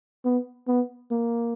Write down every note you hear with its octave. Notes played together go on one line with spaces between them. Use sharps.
B3
B3
A#3